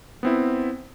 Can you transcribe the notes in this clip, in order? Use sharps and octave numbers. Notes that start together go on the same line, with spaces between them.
B3 C4 E4